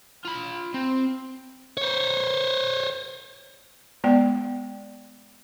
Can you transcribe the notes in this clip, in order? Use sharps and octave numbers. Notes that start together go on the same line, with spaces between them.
F4 B5
C4
C5 C#5
G#3 B3 D5 G5